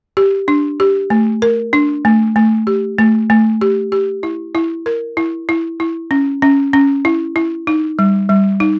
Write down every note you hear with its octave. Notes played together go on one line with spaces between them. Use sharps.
G4
D4
G4
A3
A#4
D4
A3
A3
G4
A3
A3
G4
G4
E4
E4
A#4
E4
E4
E4
C#4
C#4
C#4
E4
E4
D#4
G3
G3
D#4